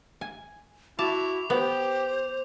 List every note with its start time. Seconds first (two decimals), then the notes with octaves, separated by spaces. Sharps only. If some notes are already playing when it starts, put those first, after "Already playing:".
0.21 G#5
0.99 E4 F#4 A5 D6 F7
1.50 B3 G4 C5